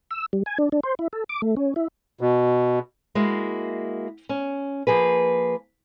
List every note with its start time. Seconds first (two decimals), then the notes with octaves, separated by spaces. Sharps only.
0.11 E6
0.33 G3
0.46 G#5
0.59 D4
0.72 D4
0.83 C5
0.99 E4
1.13 A4
1.29 D6
1.42 A3
1.57 C#4
1.76 E4
2.21 B2
3.15 G#3 A#3 E4 F#4
4.29 C#4
4.87 F3 A#3 G#4 B4